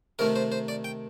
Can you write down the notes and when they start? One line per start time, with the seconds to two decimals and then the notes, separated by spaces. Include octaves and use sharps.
0.19 C3 D#3 A3 A#4
0.36 C5
0.52 C5
0.68 D5
0.84 G5